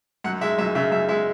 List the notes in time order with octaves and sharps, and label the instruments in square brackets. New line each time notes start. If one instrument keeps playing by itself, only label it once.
[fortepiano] F#2 F#5
G#3 E5
F#2 E5
C#3 E5
F#2 E5
G#3 E5